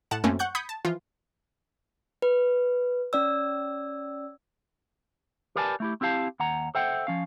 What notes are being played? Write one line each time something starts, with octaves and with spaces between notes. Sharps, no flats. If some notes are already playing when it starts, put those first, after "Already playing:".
A2 F#5 A5 E7
F#2 A3 A#3 C4 C#4
F#5 C#6 F#6 G6
B5 D#6 G6 G#6 B6 C#7
A5
E3 F3 F4
B4
C#4 D5 E6
G4 A#4 B4 D5 G#5 A5
A3 E4 G4
C4 E4 G4 F5 A5
D#2 F#5 A#5
A4 C5 E5 F#5 G5
F3 C#4 F5